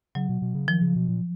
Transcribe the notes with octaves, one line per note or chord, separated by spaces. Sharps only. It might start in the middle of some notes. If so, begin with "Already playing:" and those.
C#3 F#3
B2
B2
C#3
D#3 F3
C#3
B2
A#2